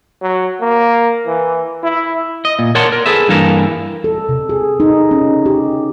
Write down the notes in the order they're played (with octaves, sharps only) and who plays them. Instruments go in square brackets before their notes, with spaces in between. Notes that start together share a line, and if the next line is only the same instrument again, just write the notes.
[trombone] F#3
A#3
E3
E4
[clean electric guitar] D#5
A#2
A#4 C#5 D5 F#5 A5 C6
A#4
G#4 A4 B4 E5
G2 E3 A#3 A4 A#4
[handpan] A4
C3
G#4
D#4
C#4
G4